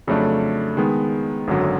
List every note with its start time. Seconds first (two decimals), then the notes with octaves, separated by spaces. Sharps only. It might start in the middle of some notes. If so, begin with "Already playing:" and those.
0.07 F2 C#3 F#3 A3 D4
0.77 D#3 G#3 B3
1.47 G#1 F#2 D3 F#3